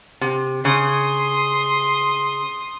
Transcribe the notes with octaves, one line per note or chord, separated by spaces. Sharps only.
C3
C#3 C6 D#6